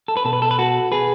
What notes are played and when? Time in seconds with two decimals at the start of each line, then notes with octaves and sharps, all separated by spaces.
0.08 A4
0.17 B4
0.25 B2 A4
0.33 B4
0.42 A4
0.51 B4
0.59 F#4 A4
0.92 B2 G#4 B4